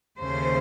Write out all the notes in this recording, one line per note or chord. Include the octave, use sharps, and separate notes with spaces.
D#2 C#3 A3 C5